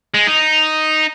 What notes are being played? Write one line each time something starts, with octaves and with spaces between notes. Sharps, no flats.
G#3
D#4